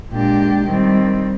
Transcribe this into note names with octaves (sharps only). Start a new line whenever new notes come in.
A#2 G#3 D4 G4
D#3 G3 C4